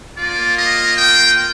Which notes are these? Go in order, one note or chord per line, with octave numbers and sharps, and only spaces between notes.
A#3 F4 D5
D#5
G5